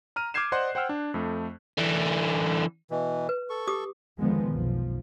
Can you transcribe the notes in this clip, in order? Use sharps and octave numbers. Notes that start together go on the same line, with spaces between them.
A#5 F6 D#7
D6 F6 G6 G#6 C7 E7
C5 D5 D#5 F#5 C6 F#6
C5 F#5 G5 E6 F6
D4
F2 A3
D3 E3
B2 E3
B4
A4 C#6
G4 D6 D#6
F2 D3 D#3 F3 G#3 B3
F1 B1 F3